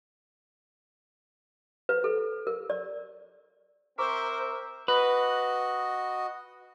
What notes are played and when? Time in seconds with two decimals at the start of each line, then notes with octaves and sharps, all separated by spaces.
1.89 B4
2.04 A4
2.47 A#4
2.70 D5
3.98 C4 A#4 C5 E5 A#5 C#6 D6
4.88 F#4 B4 D#5